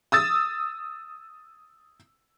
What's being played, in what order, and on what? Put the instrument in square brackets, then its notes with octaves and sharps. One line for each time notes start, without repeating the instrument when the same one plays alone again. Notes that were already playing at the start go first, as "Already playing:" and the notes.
[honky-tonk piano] D#6 E6 A6